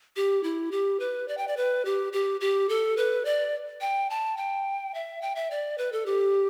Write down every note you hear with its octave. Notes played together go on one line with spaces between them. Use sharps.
G4
E4
G4
B4
D5
G5
D5
B4
G4
G4
G4
A4
B4
D5
G5
A5
G5
E5
G5
E5
D5
B4
A4
G4